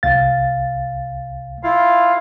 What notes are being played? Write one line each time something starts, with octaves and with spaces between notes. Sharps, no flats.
C2 F5 A6
E4 F4 F5